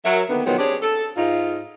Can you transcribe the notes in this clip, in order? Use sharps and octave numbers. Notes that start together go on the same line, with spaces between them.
F#3 A#4 E5
D3 D#3 A#3 B3
B2 D#3 F3 F#3 G#3 B3
C4 D4 G4 G#4 C#5
A4
G#2 D#4 F4